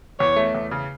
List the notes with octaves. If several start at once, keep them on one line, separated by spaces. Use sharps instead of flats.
E2 C#5
A3
E2
C#3